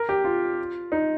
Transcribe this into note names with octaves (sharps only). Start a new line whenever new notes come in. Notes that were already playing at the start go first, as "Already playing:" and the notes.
Already playing: A#4
G4
F4
D#4